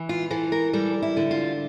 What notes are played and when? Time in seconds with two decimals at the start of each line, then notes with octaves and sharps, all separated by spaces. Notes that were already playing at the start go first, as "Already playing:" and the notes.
Already playing: E3
0.09 F4
0.31 E3 A4
0.52 A#4
0.73 G3 A4
1.02 E4
1.17 D3
1.31 F4